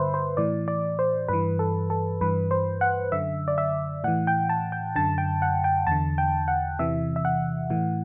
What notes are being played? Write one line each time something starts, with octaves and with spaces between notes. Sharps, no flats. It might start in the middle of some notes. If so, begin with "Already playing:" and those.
Already playing: G2 D3 B4 C5 E5
C5
A2 E3 D5
D5
C5
G2 E3 B4
A4
A4
G2 E3 B4
C5
F#5
F#2 D3 E5
D5
E5
A2 E3 F#5
G5
A5
G5
F#2 D3 A5
G5
F#5
G5
E2 D3 A5
G5
F#5
E2 C3 E3 E5
E5
F#5
A2 E3